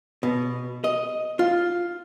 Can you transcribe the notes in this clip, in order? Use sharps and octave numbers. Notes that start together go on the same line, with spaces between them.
B2
D#5
F4